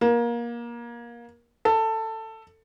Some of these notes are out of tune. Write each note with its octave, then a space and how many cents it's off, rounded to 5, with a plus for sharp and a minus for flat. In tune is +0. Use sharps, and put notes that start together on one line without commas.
A#3 +25
A4 +15